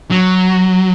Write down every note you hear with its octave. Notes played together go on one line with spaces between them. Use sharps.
F#3